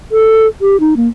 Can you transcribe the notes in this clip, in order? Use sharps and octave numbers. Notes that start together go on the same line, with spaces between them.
A4
G4
D#4
A#3